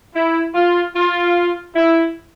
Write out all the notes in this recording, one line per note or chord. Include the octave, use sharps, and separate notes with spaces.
E4
F4
F4
E4